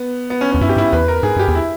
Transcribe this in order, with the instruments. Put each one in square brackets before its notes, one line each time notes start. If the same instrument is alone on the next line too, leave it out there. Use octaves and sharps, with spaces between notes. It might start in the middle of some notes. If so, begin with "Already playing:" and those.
Already playing: [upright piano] B3
B3
C#4
[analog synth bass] E2 [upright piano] C#4
[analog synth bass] G2 [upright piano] E4
[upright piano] G4
[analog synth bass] G#2 [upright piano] E4
[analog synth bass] E2 [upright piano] B4
[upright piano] A#4
[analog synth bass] G#2 [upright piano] G#4
[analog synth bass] G2 [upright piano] G4
[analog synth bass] E2
[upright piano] E4